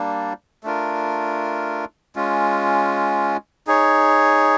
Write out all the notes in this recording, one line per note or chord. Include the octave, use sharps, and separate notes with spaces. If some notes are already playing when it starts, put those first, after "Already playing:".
Already playing: G3 A#3 D4
A3 D4 F4 A#4
G#3 C#4 F4
D#4 G#4 C#5